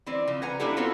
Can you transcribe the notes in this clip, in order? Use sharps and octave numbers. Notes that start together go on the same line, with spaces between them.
E3 C4 D5
C#3 F3
B4 F#5 G#5 A#5
A#3 C#4 D4 E4 G4 A4
B3 C4 F4 F#4 A4 C#5